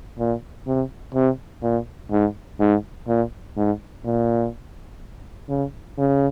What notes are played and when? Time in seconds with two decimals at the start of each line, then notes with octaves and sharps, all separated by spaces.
0.19 A#2
0.67 C3
1.14 C3
1.63 A#2
2.11 G#2
2.60 G#2
3.07 A#2
3.57 G#2
4.05 A#2
5.49 C#3
5.98 C#3